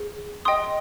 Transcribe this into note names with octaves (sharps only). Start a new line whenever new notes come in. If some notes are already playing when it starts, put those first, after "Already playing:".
Already playing: G#4
D#5 G5 C6 D#6